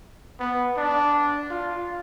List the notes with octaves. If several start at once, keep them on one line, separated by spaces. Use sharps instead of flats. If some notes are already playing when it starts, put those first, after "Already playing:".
B3
D4
F4